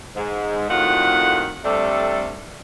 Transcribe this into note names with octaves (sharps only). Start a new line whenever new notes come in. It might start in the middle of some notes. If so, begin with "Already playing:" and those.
G#2
F2 A2 D#3 F4 F#4 F#5
C3 G3 A3 D4 A4